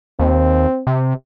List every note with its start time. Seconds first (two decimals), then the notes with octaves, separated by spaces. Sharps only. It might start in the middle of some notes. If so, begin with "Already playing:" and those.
0.19 D#2 C4
0.87 C3